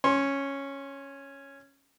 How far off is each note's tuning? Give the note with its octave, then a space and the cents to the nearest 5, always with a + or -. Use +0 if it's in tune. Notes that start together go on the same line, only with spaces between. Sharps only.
C#4 -5 C6 +30